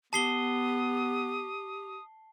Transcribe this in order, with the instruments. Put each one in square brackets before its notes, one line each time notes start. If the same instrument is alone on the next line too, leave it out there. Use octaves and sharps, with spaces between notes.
[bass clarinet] B3 [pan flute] G4 [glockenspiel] A5 C7 G7 [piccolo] D#6